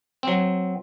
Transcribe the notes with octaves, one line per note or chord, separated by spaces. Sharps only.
F#3 C4